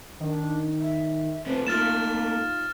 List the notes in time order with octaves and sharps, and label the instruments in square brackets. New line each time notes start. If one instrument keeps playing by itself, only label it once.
[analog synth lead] D#3 [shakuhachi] D4
[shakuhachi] E5
[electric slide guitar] C3 A3 C4 [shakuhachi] B4
[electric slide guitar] A3 A#3 [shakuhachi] D#4 [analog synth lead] F4 [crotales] F6 A6 E7